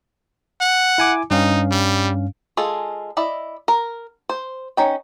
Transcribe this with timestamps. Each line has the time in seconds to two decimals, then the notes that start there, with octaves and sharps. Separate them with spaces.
0.61 F#5
0.98 E4 G#5 D6
1.31 G2 C#4 D#4 F5
1.71 G3
2.57 G#3 F4 G#4 A4
3.17 E4 D5 D#5
3.68 A#4
4.29 C5
4.77 C#4 D#4 G5